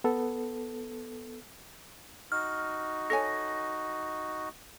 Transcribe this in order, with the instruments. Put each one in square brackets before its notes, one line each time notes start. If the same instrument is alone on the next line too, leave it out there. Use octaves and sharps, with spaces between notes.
[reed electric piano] B3 A4
[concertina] D#4 F#4 [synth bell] F6
[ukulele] A4 C#5 G#5 [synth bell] A#6